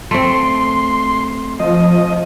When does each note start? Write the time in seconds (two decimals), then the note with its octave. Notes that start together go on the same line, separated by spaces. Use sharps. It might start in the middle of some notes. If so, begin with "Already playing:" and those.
0.11 A3 C4 C6
1.60 F3 D#5